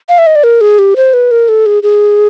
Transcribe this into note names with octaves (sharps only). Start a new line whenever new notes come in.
F5
E5
D#5
D5
A#4
G#4
G4
C5
B4
A#4
A4
G#4
G#4